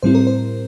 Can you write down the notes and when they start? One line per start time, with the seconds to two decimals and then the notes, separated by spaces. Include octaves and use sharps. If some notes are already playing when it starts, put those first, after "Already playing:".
0.03 A2 G3 C4 E4 C5
0.15 A#4
0.27 C5